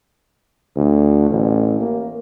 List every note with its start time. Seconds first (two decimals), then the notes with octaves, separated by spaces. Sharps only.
0.76 D2
1.30 A1
1.81 A#3